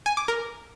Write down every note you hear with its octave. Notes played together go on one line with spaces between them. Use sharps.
G#5
D6
A#4